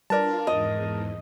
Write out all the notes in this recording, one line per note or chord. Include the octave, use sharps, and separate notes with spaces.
G3 D4 F4 A#4 B4 D5 A5
E2 G#2 D#5